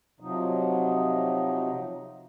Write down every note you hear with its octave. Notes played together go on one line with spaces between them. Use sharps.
C3 F3 F#3 D#4